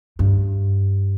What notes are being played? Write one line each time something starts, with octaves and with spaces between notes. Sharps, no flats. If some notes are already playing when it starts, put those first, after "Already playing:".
G2